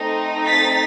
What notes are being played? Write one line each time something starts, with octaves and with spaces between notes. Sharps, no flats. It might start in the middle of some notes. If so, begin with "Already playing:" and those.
Already playing: A3 C4 D#4
A6 B6